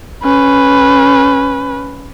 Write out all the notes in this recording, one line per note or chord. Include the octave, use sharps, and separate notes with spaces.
C#4 B4